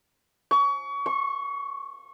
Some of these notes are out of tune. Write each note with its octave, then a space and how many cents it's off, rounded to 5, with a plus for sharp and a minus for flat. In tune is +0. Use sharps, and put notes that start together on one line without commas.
C#6 +30
C#6 -25